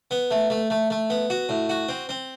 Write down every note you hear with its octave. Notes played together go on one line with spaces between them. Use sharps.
B3
A3
A3
A3
A3
B3
F#4
A2
F#4
C4
C4